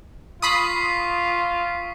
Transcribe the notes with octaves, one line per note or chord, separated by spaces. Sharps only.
F4 B5 C#6 D#6 B6 C7